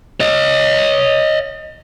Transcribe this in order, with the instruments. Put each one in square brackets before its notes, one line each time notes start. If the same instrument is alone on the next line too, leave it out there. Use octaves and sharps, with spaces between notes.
[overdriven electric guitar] C#5 D#5